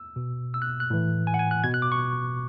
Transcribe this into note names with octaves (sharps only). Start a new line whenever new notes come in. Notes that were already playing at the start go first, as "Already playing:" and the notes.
Already playing: E6
B2
E6
F#6
F#6
A2 E3
G#5
F#5
G#5
F#6
B2 G#6
F#6
D6
C#6